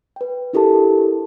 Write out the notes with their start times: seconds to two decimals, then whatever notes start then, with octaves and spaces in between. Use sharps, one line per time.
0.16 B4 G5
0.53 D4 E4 G4 A4 A#4 A5